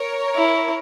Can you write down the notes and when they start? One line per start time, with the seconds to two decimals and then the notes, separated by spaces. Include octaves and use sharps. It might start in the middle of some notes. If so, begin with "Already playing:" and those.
Already playing: A#4 C#5
0.37 E4